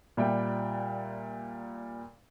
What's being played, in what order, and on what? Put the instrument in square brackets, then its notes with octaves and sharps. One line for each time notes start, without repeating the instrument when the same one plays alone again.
[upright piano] A#2 G3 E5 G5